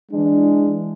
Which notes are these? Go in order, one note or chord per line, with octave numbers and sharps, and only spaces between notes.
E3 G#3 D4